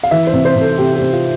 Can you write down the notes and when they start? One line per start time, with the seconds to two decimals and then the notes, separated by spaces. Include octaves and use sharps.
0.03 F5
0.11 E3 E5
0.27 C5
0.33 C3
0.45 C5
0.56 C3
0.61 A4
0.78 C3 G4
0.96 G4
1.01 C3
1.13 F4